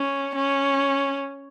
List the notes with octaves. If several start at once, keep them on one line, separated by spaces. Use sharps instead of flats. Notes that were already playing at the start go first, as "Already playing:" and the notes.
Already playing: C#4
C#4